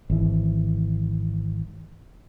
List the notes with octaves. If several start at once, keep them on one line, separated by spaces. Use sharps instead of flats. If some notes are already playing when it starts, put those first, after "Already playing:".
G#1 E3